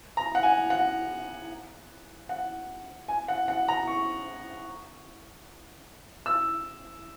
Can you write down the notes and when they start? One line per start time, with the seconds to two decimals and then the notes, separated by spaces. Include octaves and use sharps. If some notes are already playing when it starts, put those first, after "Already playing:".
0.17 A#5
0.35 F#5
0.43 G#5
0.70 F#5
2.29 F#5
3.08 G#5
3.28 F#5
3.48 F#5
3.68 A#5
3.87 C#6
6.26 E6